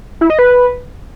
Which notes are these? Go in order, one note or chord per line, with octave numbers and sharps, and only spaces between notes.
E4
D#5
B4